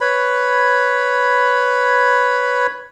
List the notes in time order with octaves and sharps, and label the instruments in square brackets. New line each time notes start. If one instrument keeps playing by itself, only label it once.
[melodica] B4 C#5 B5